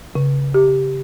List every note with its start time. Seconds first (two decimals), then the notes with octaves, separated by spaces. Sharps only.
0.15 C#3
0.54 G4